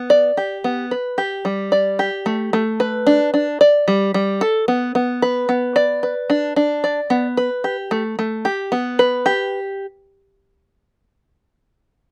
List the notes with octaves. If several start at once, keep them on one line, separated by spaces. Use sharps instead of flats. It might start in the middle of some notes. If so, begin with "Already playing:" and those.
Already playing: B3
D5
G4
B3
B4
G4
G3
D5
G4
A3
A3
B4
D4
D4
D5
G3
G3
A4
B3
B3
B4
B3
D5
B4
D4
D4
D5
B3
B4
G4
A3
A3
G4
B3
B4
G4